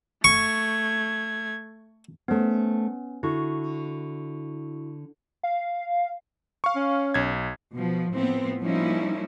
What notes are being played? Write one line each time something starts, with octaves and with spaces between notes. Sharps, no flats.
A3 C#6 G#6
A3 B3 C#4 C5
D3 E4 F#4 C#6
F5
F5 C#6
C#4
B1 G#6
B2 F3
A2 F3 B3 C4
F3 G3 A#3 C#4 D#4 E4